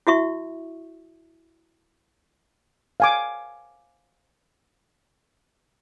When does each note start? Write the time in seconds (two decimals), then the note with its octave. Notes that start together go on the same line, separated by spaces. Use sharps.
0.07 E4 F#4 E5 C#6
3.00 F5 G#5 D6